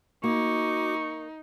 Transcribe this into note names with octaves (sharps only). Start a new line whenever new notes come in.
A#3 D#4 F#4 C#6 D6